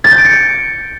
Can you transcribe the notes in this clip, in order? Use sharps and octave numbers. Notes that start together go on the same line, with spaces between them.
A6
G6
D7
C#7